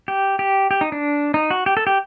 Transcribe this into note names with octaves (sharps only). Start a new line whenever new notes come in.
G4
G4
G4
D#4
D4
D#4
F#4
G4
A4
G4